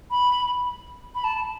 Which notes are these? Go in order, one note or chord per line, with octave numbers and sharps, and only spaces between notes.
B5
B5
A5